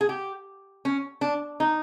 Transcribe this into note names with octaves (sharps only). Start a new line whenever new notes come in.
G#4
G4
C#4
D4
D#4